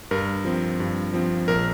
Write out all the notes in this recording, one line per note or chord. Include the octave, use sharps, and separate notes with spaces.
G2 A#4
F3 C4
G2
F3 C4
A#1 A#4